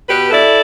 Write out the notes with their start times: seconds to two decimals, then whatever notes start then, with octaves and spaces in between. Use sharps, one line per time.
0.08 B2 G4 B4
0.30 E4 A4 D5